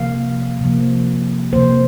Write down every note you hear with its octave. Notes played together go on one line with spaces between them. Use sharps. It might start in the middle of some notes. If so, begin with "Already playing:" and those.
Already playing: C3 F3 A#3 F5
C3 F3 A#3
C3 F3 A#3 C5